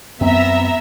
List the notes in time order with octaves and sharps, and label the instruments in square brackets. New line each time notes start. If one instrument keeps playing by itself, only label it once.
[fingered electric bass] F#2 C4 [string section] B3 E5 A#5